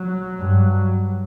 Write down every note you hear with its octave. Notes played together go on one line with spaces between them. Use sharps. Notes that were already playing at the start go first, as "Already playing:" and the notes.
Already playing: F#3
G2